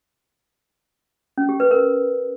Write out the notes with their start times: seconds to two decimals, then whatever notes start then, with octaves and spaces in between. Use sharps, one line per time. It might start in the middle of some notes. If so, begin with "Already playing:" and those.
1.38 C#4
1.49 G4
1.60 B4
1.71 A#4